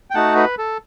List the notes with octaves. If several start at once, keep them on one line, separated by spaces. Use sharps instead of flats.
G5
A3 D#4 F#4 F#5 A5
B4
A4